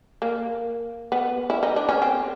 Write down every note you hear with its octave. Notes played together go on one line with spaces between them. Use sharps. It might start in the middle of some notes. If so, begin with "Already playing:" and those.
A#3
B3
E4
D#4
D4
C#4
C4